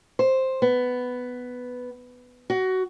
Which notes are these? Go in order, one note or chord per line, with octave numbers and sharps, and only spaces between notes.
C5
B3
F#4